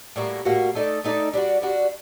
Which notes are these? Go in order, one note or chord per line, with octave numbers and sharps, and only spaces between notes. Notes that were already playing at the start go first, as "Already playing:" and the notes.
A2 G3 A#3 F#4
A2 G3 A#3 F#4
A3 D#4 A4 D5
A3 D#4 A4 D5
G3 D4 F#4
G3 D4 F#4